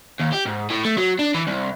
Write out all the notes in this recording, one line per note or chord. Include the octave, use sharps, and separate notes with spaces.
D#2
G4
G#2
A2
A3
F#3
D4
E3
C2